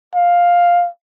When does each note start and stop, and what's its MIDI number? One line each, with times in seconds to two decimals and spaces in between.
0.15 0.88 77